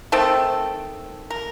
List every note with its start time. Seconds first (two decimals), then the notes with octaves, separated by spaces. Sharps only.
0.12 D#3 A3 C4 A4
1.30 A#4